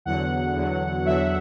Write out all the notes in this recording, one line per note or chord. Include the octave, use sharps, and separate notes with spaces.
E2 D3 F#3 F#5
E2 D3 F#3
E2 D3 F#3 E5